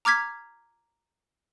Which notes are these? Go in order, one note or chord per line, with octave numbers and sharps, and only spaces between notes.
A#5 D6 F6 G#6 B6